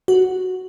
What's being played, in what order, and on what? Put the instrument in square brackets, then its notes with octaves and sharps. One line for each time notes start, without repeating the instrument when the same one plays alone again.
[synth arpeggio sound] F#4